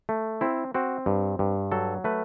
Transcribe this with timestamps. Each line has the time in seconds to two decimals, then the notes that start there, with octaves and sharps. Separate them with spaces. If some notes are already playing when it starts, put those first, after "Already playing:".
0.09 A3
0.41 C4 E4
0.74 C4 F#4
1.06 G2
1.39 G2
1.72 F#3 A4
2.04 A3 B4